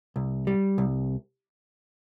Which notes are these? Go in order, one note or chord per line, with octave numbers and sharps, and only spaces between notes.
C2
G3
C2